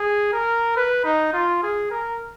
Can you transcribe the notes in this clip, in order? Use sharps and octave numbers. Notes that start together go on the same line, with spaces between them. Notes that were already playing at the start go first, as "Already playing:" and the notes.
Already playing: G#4
A#4
B4
D#4
F4
G#4
A#4